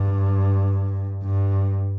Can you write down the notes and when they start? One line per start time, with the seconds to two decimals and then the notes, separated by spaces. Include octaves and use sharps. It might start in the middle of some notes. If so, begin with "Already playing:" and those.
Already playing: G2
1.23 G2